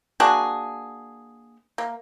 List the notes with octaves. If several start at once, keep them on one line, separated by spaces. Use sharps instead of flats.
A#3 D4 F#4 G#4
A#3